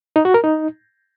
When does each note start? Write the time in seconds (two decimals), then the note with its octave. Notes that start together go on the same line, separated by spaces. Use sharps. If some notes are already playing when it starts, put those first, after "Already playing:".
0.16 D#4
0.25 F#4
0.34 A#4
0.44 D#4